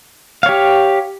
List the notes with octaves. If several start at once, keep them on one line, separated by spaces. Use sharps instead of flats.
G4 C#5 F5